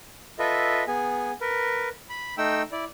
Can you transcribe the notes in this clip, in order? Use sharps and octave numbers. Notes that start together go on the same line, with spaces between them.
F4 A4 B4 D#5 E5
B3 G#4 G#5
A#4 B4
B5
A3 D#4 G5 E6
E4 D5